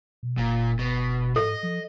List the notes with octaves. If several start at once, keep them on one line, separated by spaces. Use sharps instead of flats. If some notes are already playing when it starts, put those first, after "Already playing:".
B2
F#1 A#2
B2
G#2 A4 D#5
F3